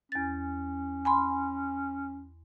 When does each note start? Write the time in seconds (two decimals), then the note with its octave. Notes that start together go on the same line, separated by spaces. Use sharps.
0.12 E2 C#4 A6
1.05 G#5 B5 C6